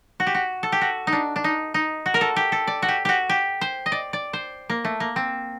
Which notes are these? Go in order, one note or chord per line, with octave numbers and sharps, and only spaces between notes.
F#4
G4
F#4
A4
G4
F#4
D#4
D4
D4
D#4
D#4
F#4
A#4
A4
G4
A4
D5
F#4
G4
F#4 G4
G4
C5
D#5
D5
D5
C5
A#3
A3
A#3
C4